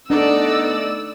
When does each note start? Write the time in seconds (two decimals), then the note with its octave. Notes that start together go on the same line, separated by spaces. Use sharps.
0.10 A3 B3 D4 D#4 A4 D5 E6